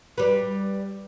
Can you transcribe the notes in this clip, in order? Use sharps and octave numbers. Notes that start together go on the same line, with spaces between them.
G3 B4